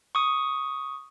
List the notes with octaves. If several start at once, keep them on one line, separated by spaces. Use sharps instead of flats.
C#6 D#6